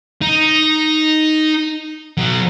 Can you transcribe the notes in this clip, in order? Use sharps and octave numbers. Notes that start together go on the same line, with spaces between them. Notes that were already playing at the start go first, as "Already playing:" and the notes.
D#4
B2 F#3